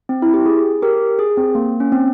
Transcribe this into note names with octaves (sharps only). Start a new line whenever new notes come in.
C4
E4
G4
G#4
G4 A#4
G#4
C4
A#3
C#4
C4